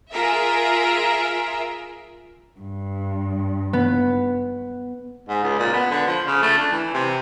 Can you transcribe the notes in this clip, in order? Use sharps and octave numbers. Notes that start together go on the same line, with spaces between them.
F4 G#4 A#4 E5
G2
B3
G#2
C#2
A#2
B3
D3
F3
C#3
A3
D4
E3
C3